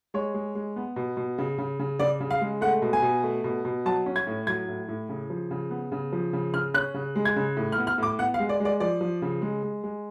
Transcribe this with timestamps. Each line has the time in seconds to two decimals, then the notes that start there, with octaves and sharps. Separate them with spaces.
0.14 G#3 C#5
0.34 G#3
0.55 G#3
0.76 B3
0.96 B2
1.17 B2
1.38 C#3
1.58 C#3
1.79 C#3
1.99 C#3 D5
2.20 C#3
2.31 F5
2.41 G#3
2.61 A3 F#5
2.82 B2
2.93 G#5
3.02 B2
3.23 A3
3.44 B2
3.65 B2
3.86 F#3 A5
4.06 C#4
4.16 G#6
4.27 A2
4.47 F#3 G#6
4.68 A2
4.88 A2
5.09 C#3
5.30 F3
5.51 C#3
5.70 B3
5.92 C#3
6.12 F3
6.33 C#3
6.54 C#3 F6
6.74 C#4 F#6
6.94 C#3
7.16 G#3
7.25 G#6
7.36 C#3
7.56 A2
7.72 F6
7.77 B3
7.87 F6
7.98 A2 D6
8.19 B3 F#5
8.34 F5
8.40 G#3
8.49 D5
8.60 G#3
8.65 D5
8.80 F3 D5
9.01 F3
9.22 C#3
9.42 G#3
9.63 G#3
9.84 G#3